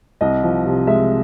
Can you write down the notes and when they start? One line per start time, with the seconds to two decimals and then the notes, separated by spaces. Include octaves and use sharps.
0.21 C2 D#5
0.43 F3
0.66 C3
0.87 G#3 E5